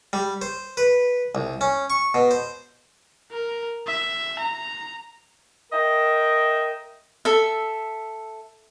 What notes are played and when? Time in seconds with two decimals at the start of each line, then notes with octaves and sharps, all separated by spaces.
0.13 G3
0.42 C5
0.77 B4
1.35 C2
1.61 C#4
1.90 C#6
2.14 B2
2.31 C5
3.32 A#4
3.87 E5
4.39 A#5
5.72 A#4 D#5 E5 G5
7.25 A4 E5